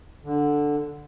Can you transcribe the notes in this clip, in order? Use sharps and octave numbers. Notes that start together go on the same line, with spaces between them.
D3